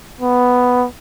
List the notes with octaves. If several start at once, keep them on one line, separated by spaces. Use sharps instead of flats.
B3